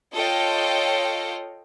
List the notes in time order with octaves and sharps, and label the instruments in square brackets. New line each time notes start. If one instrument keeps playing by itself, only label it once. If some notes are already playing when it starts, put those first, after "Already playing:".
[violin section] F4 A4 C#5 D#5 F5 G5